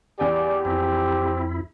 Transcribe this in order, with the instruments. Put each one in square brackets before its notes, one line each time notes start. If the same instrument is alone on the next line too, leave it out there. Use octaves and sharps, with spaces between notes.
[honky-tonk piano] E2 G5 G#5 [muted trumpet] G4 [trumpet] D5
[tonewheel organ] F2 E4 [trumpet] C4